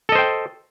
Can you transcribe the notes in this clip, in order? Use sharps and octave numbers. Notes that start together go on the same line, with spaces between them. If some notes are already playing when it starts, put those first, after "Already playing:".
A4 C5 D#5 G5